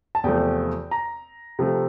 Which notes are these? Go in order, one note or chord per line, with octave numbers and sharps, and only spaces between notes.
A5
E2 C3 F3 A3 G5
A#5
C3 F3 A3